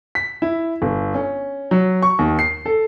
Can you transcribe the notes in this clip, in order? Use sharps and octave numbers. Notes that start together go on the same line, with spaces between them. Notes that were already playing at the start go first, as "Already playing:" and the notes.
B6
E4
G1
C#4
F#3
C#6
D#2
C7
A4